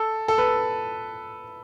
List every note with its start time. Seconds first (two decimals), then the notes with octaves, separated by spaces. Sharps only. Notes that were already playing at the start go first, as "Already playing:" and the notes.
Already playing: A4
0.28 A4
0.38 B4